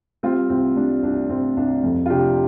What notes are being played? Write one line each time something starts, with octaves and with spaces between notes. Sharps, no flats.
G3 C4 F4
C2 C4
G3 D4
C2 D4
C2 C4
C2 D4
F2
F4
C3 D4 G4